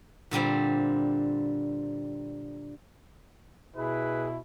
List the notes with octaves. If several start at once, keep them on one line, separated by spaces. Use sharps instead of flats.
A#2 D3 G3 C4
B2 E4 G#4 B4